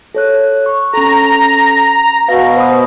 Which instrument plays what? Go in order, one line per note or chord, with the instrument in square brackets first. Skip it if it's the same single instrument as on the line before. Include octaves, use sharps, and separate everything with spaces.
[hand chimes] A4 C#5 F#6
C#6
[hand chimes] C#4 A4 [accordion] A#5
[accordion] B2 [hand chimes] B4 F5 A#6
[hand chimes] C5 B5 D#6